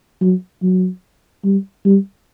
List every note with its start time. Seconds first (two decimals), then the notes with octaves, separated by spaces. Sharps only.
0.21 F#3
0.63 F#3
1.44 G3
1.85 G3